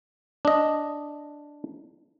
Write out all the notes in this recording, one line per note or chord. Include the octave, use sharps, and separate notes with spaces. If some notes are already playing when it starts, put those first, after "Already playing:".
D4 D#5